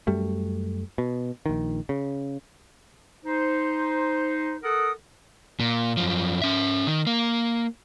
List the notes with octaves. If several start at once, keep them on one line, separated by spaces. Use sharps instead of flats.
F#2 G3 A3
B2
A#1 D#3
C#3
D#4 C5
A4 A#4 F#5 D#6
A#2
F#2 F3
C#4 E5
D#3
A#3